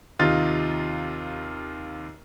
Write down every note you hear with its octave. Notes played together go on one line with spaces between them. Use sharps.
D#2 C3 D#4 F4 A6